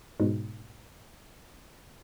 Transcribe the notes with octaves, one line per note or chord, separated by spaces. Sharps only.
G#2 B2